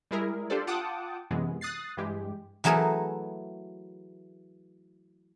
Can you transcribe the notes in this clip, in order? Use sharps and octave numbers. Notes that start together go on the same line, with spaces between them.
G3 G#3 E4 G#4 A#4
D4 F4 G4 A4 C5 D5
F4 F#5 G5 A5 D6 D#6
F#2 C3 E3 G#3 B3
D#6 F#6 A6 C7
G2 E3 G#3 G4
E3 F#3 A3 G#4 A#4 B4